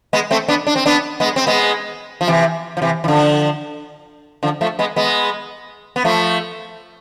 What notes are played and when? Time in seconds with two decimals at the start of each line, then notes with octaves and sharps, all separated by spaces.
0.13 G#3 B3
0.31 A3 C4
0.48 B3 D4
0.67 D4
0.76 C4
0.86 B3 D4
1.20 G#3 B3
1.36 C4
1.47 G#3 B3
2.21 F3
2.28 C3 E3
2.77 F3
2.82 C3 E3
3.04 E3
3.08 D3 F3
4.43 D3 F3
4.61 F3 A3
4.79 G#3 B3
4.96 G#3 B3
5.96 B3
6.05 F3 A3